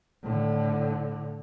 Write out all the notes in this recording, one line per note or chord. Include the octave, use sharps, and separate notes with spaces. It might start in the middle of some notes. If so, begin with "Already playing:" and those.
A2 D3